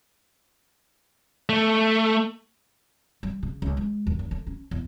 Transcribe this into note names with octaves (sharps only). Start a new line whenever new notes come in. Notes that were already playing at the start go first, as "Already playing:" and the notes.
A3
G3
C#3
C#2
G#3
D#2
D#2
D3
C#4
E2